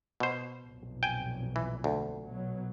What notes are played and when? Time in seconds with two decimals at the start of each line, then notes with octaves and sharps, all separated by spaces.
0.20 B2 C5
0.64 B1 F2 A#2
1.03 G5 G#5
1.56 E3
1.84 D2
2.25 B2 F#3